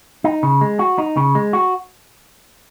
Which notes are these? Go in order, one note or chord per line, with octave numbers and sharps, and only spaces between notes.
D#4
C#3
G#3
F#4
D#4
C#3
G#3
F#4